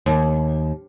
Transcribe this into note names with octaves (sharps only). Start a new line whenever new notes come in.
D#2